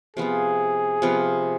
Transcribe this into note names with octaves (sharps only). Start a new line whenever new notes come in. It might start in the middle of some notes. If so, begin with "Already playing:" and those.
C3 F3 B3 F4 G#4
C3 F3 B3 F4